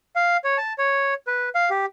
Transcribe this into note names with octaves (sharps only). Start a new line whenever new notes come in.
F5
C#5
A5
C#5
B4
F5
G4